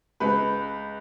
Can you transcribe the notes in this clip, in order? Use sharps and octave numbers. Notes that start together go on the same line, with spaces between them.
C#2 B4